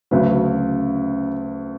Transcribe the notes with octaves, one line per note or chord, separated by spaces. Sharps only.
D2 C#3 F#3 B4